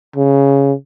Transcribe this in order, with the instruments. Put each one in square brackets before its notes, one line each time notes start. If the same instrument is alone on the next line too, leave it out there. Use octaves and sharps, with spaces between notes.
[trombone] C#3